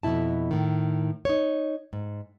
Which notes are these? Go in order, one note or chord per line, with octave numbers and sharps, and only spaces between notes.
F2 G#2 B2 E4 A5
A2 D#3
D#4 C#5
G#2